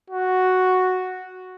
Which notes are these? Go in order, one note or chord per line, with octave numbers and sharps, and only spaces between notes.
F#4